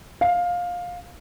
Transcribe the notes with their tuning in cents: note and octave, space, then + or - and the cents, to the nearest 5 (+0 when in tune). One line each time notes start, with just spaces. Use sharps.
F5 +15